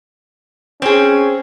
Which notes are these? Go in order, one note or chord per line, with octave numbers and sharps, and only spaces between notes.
C4 C#4 G#4